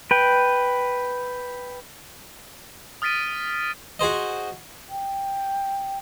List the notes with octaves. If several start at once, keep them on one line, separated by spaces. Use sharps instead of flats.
B4 G5
D#6 F6 A6 B6 D7 D#7
F#4 G#4 C5 D#5
G5